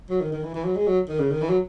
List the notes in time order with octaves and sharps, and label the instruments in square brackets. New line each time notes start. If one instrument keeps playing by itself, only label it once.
[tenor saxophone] F#3
D#3
D#3
E3
E3
F#3
G#3
F#3
D#3
C#3
D#3
E3
F#3